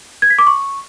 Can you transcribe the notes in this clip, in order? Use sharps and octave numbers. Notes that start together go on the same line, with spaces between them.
G#6
B6
D6
C#6